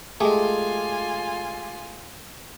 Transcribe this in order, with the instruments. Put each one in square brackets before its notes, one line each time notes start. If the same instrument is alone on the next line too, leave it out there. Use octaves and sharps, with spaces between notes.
[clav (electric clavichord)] G#3 A3 [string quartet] F4 G#5 [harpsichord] G4 G#4